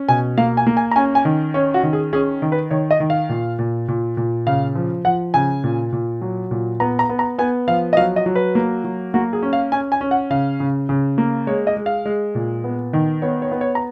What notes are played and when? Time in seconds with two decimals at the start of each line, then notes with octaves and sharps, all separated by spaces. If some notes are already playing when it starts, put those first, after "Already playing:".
Already playing: C#4
0.08 B2 G#5
0.38 A#3 F5
0.57 G#5
0.67 A#3
0.77 G#5
0.91 A#5
0.96 C#4 G#5
1.15 G#5
1.25 D#3
1.54 C#4 C#5
1.74 F#4
1.83 D#3
1.93 G#4
2.13 C#4 G#4
2.42 D#3
2.52 B4
2.71 D#3 C#5
2.91 D#5
3.00 D#3
3.10 F5
3.29 A#2
3.59 A#2
3.88 A#2
4.17 A#2
4.46 C#3 F5
4.76 F3
5.05 F3 F#5
5.34 C#3 G#5
5.64 A#2
5.93 A#2
6.22 F#3
6.51 A#2
6.80 B3 A#5
6.99 A#5
7.09 B3
7.19 A#5
7.38 B3 G#5
7.68 F3 F5
7.93 D#5
7.97 F#3 F5
8.16 D#5
8.26 F#3
8.35 B4
8.55 A#3
8.84 F#3
9.14 A#3 F#4
9.33 G#4
9.43 C#4
9.53 F5
9.72 C#4 G#5
9.92 G#5
10.01 C#4
10.11 F#5
10.30 C#3 F5
10.60 C#3
10.89 C#3
11.18 A#3
11.47 G#3 C#5
11.67 D#5
11.76 G#3
11.86 F5
12.05 G#3
12.35 A#2
12.64 B3
12.93 D#3
13.22 B3 C#5
13.42 C#5
13.51 B3
13.61 C#5
13.75 A#5